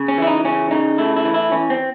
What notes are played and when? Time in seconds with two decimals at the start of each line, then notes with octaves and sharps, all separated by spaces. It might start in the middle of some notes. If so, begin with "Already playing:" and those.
Already playing: C#3
0.08 C#4
0.18 E3 E4
0.27 D#4
0.45 C#3 C#4
0.71 C#3 D#4
0.98 A3 E4
1.16 E4
1.25 E3
1.34 E4
1.52 E3 C#4
1.70 C4